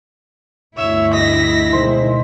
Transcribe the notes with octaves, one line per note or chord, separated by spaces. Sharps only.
G1 D2 E4 C#5 E5
D#5 A#6 B6
B2 D#3 G#3 C5